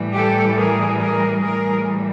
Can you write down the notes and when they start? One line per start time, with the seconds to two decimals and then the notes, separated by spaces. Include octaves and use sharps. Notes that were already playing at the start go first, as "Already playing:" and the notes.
Already playing: A2 E3 G3
0.13 G4 A4
0.56 G#4 A#4
0.99 G#4 A#4
1.40 A2 E3 G3 G#4 A#4